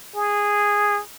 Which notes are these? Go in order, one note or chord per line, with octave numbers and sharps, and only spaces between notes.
G#4